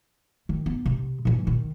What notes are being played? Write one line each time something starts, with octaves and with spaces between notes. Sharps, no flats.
D#3
B3
C3
A#2 E3
D#3